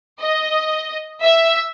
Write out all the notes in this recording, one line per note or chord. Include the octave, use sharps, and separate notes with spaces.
D#5
E5